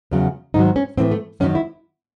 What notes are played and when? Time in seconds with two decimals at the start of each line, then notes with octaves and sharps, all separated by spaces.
0.11 E2 C#3 F#3
0.54 G#2 D#3 F#3 D#4
0.76 C#4
0.97 A2 E3 C4
1.11 A3
1.40 F#2 D#3 F#3 C#4
1.55 E4